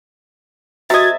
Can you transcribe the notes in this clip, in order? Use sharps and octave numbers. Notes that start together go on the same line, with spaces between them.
C3 F#4 D#5 E5 G#6 A6